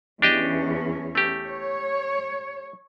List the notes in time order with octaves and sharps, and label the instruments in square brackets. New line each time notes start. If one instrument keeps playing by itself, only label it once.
[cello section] E2 C#4 [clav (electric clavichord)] D4 G4 D#5
[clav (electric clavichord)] A3 G4
[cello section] C#5